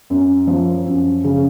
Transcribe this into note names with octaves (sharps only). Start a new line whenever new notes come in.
F#2
F3
F#2
C#3